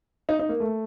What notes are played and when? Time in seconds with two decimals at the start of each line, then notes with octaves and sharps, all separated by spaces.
0.29 D#4
0.39 D#4
0.49 A#3
0.60 A3